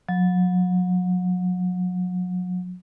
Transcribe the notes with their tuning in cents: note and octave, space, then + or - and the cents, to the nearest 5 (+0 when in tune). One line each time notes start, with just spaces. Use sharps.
F#3 -35